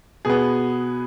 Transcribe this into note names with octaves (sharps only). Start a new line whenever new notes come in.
B2 B3 G#4